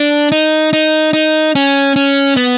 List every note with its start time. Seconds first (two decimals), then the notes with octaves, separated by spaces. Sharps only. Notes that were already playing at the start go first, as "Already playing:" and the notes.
Already playing: D4
0.32 D#4
0.73 D#4
1.13 D#4
1.55 C#4
1.96 C#4
2.37 B3